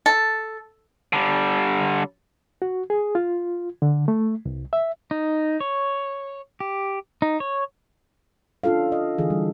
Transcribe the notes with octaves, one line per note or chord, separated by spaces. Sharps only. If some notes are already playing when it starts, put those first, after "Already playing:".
A4
D3 G3
F#4
G#4
F4
D3
A3
C2
E5
D#4
C#5
G4
D#4
C#5
C#4 D4 F4 A4 F5
D#5
D3 E3 G#4
G3